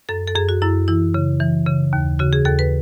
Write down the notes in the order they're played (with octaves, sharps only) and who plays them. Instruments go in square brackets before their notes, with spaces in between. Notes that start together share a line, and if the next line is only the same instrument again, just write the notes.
[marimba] F#2 A4
A4
F#2 G#4
F#4
F#2 E4
E3 E4
C#3
E3
C#3
D#2
C#3 F#4
G#4
D#2 A4
B4